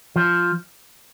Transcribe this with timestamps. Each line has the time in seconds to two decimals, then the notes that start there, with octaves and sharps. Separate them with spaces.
0.16 F3